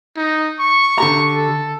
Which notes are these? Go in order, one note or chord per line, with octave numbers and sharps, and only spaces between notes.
D#4
C#6
D3 G4 A#5
A4